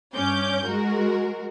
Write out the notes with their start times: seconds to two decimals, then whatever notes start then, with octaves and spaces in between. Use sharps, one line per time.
0.15 G2 C#4 D6 G6
0.64 G#3 F#4 A#4